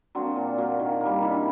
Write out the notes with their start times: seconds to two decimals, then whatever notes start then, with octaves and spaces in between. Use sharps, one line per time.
0.15 F#3 A#3 C4 D4
0.36 A#2
0.58 F#3 A#3
0.79 D#3
1.01 G3 A#3
1.22 D#3 D4 E4